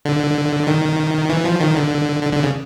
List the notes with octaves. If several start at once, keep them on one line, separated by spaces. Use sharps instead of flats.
D3
D#3
E3
F3
D#3
D3
D3
D3
C#3